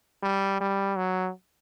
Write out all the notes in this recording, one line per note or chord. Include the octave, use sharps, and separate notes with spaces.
G3
G3
F#3